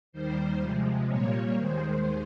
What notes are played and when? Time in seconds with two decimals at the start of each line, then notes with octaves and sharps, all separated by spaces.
0.12 D#2 D#3 G3 C5
0.61 C3 F3 G#3
1.07 A#2 G3 A#3 C#5
1.56 D#2 D#3 G#3 C5